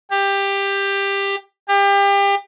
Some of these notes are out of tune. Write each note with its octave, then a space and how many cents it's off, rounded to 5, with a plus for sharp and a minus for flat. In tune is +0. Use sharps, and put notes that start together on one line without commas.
G4 +15
G4 +30